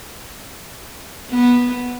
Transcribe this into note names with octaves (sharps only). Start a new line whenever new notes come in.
B3